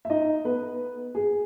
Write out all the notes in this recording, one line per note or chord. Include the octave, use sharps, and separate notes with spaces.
E5
D#4 D#5
B3 B4
G#4